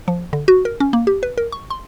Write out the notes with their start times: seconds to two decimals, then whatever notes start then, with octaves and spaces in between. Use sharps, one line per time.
0.08 F3
0.33 D3
0.48 F#4
0.65 A#4
0.80 C#4
0.93 A#3
1.07 G4
1.23 B4
1.38 A#4
1.52 C#6
1.70 C6